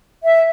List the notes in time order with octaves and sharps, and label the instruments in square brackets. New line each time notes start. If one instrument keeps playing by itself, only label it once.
[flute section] E5